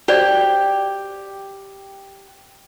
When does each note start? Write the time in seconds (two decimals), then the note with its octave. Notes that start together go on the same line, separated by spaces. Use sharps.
0.08 F#4 G4 C5 D5